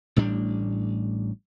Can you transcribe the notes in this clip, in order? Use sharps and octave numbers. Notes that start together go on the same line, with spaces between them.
A1 A2 G3 D4